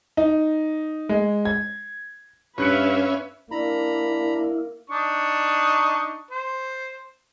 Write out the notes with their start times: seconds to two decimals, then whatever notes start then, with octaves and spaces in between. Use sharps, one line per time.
0.17 D#4
1.09 G#3
1.45 G#6
2.58 G2 C#4 B4 E5 F5 F#6 C#7
3.51 A#3 D4 E4 A#5 B5
4.90 D4 D#4 C#6
6.31 C5